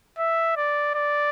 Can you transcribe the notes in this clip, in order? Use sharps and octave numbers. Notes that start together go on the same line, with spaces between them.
E5
D5
D5